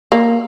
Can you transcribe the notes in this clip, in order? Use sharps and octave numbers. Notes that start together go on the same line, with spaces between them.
A#3